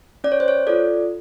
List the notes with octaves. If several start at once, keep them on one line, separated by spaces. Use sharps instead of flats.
C#4 D5
C#5
C5
C#5
F4 A4 D5